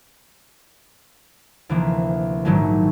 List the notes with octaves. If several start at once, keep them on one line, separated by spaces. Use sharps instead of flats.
D2 C3 E3 F3 A#3
A#1 G#2 D#3 E3 F#3 A3